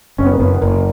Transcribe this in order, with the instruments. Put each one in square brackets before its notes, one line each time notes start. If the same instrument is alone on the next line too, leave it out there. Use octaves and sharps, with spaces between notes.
[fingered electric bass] F#1 [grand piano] C#4
[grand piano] B3
A#3
[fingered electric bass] F#1 [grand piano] B3
[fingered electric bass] F#1 [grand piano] A#3